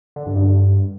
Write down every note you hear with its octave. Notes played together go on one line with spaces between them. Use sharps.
D3
G2
G2